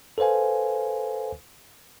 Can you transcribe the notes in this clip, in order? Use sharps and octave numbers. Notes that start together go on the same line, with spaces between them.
A4 B4 C5 F5 G#5